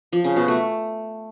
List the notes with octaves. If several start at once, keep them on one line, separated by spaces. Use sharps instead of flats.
F3
C#3
B2
A3